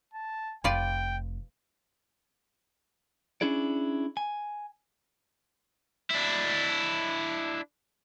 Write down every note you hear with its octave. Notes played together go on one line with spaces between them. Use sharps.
A5
F1 F4 B4 D5 G5
C#4 D4 E4 G#4 D5
G#5
D4 E4